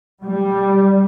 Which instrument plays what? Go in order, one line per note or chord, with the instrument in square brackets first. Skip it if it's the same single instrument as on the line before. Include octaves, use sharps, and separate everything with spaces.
[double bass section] G3